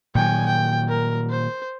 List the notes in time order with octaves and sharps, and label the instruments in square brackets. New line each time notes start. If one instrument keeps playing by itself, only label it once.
[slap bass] A#2 D#3 F#3 [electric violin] G5 G#5
[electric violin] G5
A#4
C5